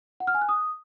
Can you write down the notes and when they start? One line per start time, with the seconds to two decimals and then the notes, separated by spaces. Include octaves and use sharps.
0.20 F#5
0.27 F6
0.34 G#5
0.42 F#6
0.49 D#6